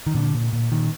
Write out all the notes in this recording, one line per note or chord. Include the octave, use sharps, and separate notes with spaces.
D#3
A#2 D3
A#2
A#2
A#2 D#3